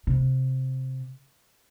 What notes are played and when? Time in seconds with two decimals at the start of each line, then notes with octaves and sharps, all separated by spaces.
0.07 C3